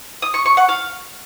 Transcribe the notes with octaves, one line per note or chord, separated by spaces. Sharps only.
D#6
C#6
C#6
F#5
F5